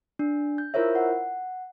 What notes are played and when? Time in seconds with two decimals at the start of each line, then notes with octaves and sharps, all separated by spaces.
0.19 D4
0.58 G6
0.74 E4 F4 A#4 C5 C#5 E5
0.95 F#5